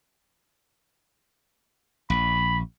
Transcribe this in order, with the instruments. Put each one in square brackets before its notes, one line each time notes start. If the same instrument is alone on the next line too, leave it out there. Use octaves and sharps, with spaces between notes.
[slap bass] A#1 [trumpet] B5